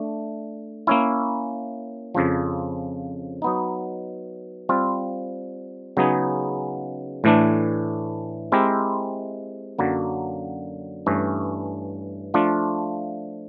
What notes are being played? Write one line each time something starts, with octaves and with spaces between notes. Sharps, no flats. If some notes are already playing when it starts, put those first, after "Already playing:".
Already playing: A3 D4
A#3 C#4 E4
F2 C#3 F3
F#3 B3 D#4
G3 C4 F4
C#3 F#3 B3 D#4 G#4
A2 E3 A3 D4
G#3 C4 E4 G4 A#4
F#2 D3 F#3 A#3
G2 E3 A3 C#4
F3 A3 D4 F4